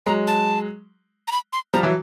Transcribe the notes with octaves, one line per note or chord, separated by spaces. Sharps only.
F#3 G#3 A#5
A5
A#5
B5
C6
F3 G3 A#5
E3 F#3